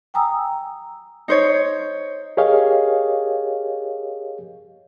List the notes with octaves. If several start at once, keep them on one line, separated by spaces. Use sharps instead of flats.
G5 G#5 A#5 D#6 E6
D#4 C5 C#5
G4 G#4 A#4 C#5 D#5 F5